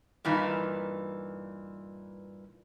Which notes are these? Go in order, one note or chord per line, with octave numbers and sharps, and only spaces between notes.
G2 A#2 E3 D#4